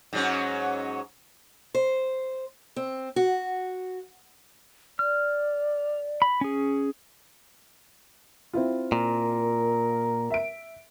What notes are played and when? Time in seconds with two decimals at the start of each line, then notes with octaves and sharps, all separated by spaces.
0.13 G#2 F#3 C#4
1.75 C5
2.76 C4
3.16 F#4
4.99 D5 F6
6.22 B5
6.41 C#4 G#4
8.53 C4 E4 F4
8.92 A#2 A#4
10.30 E5 D7